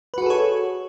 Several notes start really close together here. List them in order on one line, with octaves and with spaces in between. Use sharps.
B4 F#4 G#4 A4 C#5